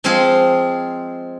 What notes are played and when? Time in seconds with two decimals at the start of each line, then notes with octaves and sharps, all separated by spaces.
0.04 F3 G#3 C4 F4 G#4